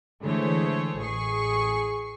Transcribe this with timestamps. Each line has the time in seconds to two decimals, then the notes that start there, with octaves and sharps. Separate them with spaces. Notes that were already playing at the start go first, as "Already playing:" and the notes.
0.23 D3 E3 G#3 A3 C5 C#5
1.01 A1 G#4 C#6 C7